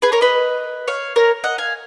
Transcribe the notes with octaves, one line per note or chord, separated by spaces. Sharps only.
G#4 B4
A#4 C#5
B4 D#5
C#5 F5
A#4 C#5
D#5 F#5
F5 G#5